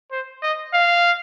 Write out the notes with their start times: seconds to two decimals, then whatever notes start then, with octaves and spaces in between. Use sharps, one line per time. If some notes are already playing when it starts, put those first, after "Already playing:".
0.11 C5
0.43 D#5
0.74 F5